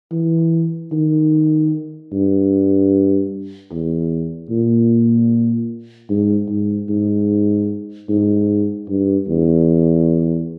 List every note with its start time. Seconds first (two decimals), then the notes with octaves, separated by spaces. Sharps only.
0.12 E3
0.92 D#3
2.12 G2
3.72 E2
4.50 A#2
6.10 G#2
6.49 G#2
6.89 G#2
8.09 G#2
8.89 G2
9.29 E2